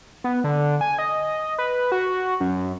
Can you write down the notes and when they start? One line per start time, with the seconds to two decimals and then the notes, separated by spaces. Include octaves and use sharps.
0.24 B3
0.44 D3
0.81 G#5
0.99 D#5
1.58 B4
1.92 F#4
2.41 F#2